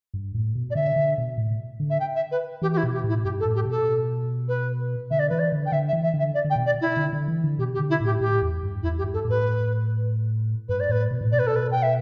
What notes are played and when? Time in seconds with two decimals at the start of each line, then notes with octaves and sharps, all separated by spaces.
0.14 G2
0.35 A2
0.55 B2
0.71 D5
0.75 D3 E5
0.96 D3
1.18 B2
1.38 A2
1.80 D3
1.90 E5
2.00 G5
2.16 E5
2.31 B4
2.62 E3 G4
2.73 G4
2.77 E4
2.83 B2
2.93 G4
3.04 A2
3.09 E4
3.24 G2 G4
3.40 A4
3.45 A2
3.55 G4
3.65 B2
3.71 A4
4.48 B4
5.11 D3 E5
5.19 D5
5.29 E3 B4
5.39 D5
5.52 D3
5.66 G5
5.72 D3 E5
5.88 E5
5.93 E3
6.03 E5
6.14 D3
6.19 E5
6.34 D5
6.45 D3
6.50 G5
6.56 B2
6.66 D5
6.81 E4
6.97 D3
7.13 D3
7.28 E3
7.44 D3
7.59 B2 G4
7.74 G4
7.79 D3
7.90 E4
8.00 A2
8.05 G4
8.21 A2 G4
8.42 E2
8.63 G2
8.83 E2 E4
8.98 G4
9.04 G2
9.13 A4
9.25 A2
9.30 B4
10.69 G2 B4
10.80 D5
10.89 A2 B4
11.11 B2
11.21 A2
11.32 B2 D5
11.39 B4
11.47 A4
11.56 B4
11.71 G5
11.83 E5